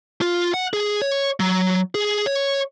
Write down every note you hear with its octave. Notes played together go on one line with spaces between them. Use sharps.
F4
F#5
G#4
C#5
F#3
G#4
C#5